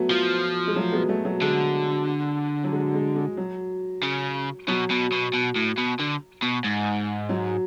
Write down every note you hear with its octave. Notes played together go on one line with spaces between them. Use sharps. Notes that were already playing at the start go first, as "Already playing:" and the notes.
Already playing: F#3 A3 B3
F3
G#3
F#3 A3
G#3 B3
F#3 A3
F#3 A3
D3 G#3
F#3
G#3
G#3
G#3
F#3
C#3
B2 F#3
B2
B2
B2
A2
B2
D3
B2
G#2
F#3